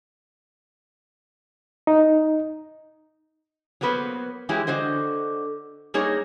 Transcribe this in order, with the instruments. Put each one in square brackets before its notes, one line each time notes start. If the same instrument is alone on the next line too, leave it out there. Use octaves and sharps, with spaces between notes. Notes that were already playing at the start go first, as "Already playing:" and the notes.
[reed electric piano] D#4
[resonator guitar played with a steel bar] F#3 A#3 B3 B4 C5
E3 F#3 G#3 E4 G4 G#4
D3 F#4 C5 D#5
G3 A#3 D#4 G#4 A#4 C#5